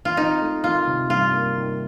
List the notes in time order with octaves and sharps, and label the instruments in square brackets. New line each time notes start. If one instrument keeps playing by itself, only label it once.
[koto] F4
[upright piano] C4 [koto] D#4
[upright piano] A3
[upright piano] D#3 [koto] F4
[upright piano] C3
[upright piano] G2 [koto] F4
[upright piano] A#3
D#3